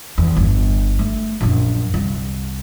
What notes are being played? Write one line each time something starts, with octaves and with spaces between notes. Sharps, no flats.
E2
G1
A3
A#1 F#2
C2